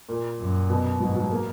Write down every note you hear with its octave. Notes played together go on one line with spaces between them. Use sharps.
A#2
F#2
B2
G#2 F#3
F#3
A#3